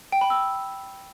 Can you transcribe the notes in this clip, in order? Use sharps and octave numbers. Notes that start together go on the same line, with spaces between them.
G5
B5
E6